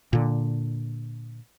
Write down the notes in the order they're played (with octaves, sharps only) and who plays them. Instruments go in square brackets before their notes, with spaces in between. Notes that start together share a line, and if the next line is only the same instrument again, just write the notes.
[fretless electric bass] A#2 D3